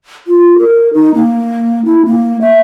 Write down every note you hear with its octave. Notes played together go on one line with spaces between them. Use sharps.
F4
A#4
D#4
A#3
E4
A#3
E5